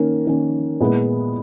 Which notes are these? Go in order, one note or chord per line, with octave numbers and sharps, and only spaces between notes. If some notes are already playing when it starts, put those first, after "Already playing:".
Already playing: D#3 A#3 C#4
D#3 A#3 C#4
A#2 G#3 B3 E4